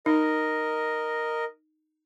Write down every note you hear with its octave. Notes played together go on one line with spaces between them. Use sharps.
D#4 A#4 D#5